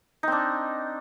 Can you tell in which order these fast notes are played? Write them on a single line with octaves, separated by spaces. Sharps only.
D#4 C4 D4